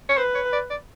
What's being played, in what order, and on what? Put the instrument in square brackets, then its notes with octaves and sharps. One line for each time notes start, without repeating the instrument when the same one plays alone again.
[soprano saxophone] C#5
[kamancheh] B4 [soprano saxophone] C5
[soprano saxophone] C#5
D5
D5